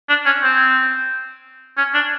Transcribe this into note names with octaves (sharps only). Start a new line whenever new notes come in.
D4
C#4
C4
C#4
D4